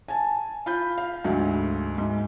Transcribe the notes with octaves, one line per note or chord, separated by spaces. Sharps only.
G#5 A5
F4 B5 G6
F5
D2 G#2 F#3
G#2